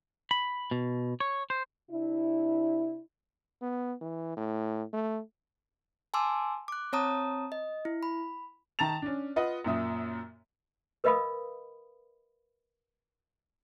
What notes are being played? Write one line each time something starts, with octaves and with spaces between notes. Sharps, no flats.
B5
B2
C#5
C5
C3 D4 E4
B3
E3
A2
A3
G#5 A5 C6 D6 E6
D6 F#6
C4 C#5 A5 A#5 D#6
D#5
E4
B5
D#3 A5 A#5 A6 F7
C#4 D4
F4 B4 D#5 F#5
F#2 A#2 E5 D#6
A#4 B4 D#5 F5 B5 D#6